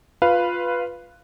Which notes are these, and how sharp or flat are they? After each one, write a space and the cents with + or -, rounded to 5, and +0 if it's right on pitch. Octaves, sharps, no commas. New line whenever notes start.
F4 +10 B4 +0 F5 -10